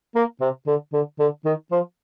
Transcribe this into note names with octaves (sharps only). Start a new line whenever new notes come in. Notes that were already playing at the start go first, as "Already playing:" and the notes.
A#3
C3
D3
D3
D3
D#3
F3